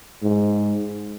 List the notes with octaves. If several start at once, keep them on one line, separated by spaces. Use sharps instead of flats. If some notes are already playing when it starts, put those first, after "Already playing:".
G#2